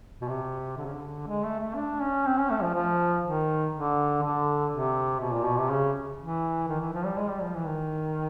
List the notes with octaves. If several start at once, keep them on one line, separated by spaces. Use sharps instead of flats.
B2
C3
D3
C#3
D3
G#3
A3
A3
D4
C#4
C4
C#4
A3
F3
F3
D#3
D3
D3
C3
B2
A#2
B2
C3
C#3
E3
D#3
E3
F3
G3
G#3
G3
F3
E3
D#3